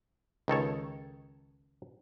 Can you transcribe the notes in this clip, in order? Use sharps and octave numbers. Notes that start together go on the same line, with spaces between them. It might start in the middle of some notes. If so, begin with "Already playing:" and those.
C#2 D#3 A4 C#5